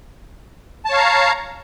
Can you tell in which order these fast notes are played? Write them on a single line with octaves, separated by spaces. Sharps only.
A5 C#5 F5 A#5